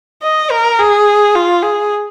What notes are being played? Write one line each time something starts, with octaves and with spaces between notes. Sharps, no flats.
D#5
A#4
G#4
F4
G#4